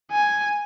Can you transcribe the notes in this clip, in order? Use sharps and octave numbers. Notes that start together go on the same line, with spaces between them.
G#5